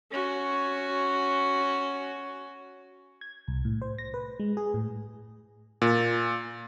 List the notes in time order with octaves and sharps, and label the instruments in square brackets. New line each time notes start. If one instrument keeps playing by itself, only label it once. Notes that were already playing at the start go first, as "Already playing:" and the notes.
[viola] C#4 F#4
[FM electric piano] G#6
C2
A2
C5
A#6
B4
G#3
G#4
A2
[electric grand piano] A#2